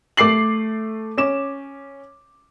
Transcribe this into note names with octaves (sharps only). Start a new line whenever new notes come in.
A3 D6 C7 F#7
C#4 D6 E7